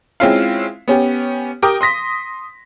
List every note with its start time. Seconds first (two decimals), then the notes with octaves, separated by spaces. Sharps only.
0.20 G#3 C4 C#4 E4 F4 F5
0.88 B3 C#4 G4
1.62 G4 A#4 G5 D6 D#6
1.81 C6 D#6 A#6 B6